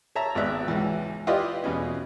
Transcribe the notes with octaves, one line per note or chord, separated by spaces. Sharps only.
C#5 E5 A5 A#5
G#1 B3 D5 E5 F#6
C#2 E3
E4 F4 G4 B4 D5 D#5
E2 B2 C#4